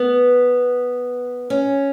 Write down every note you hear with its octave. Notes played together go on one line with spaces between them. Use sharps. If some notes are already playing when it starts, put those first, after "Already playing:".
Already playing: B3
C#4